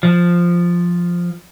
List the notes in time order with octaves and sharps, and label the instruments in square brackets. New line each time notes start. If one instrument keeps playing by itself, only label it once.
[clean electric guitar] F3